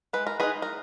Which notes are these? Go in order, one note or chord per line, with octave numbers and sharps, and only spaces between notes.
G#3 B4
A#4
D#4 G#4 B4
A#4